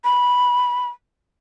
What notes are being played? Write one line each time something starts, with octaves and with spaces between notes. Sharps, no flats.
B5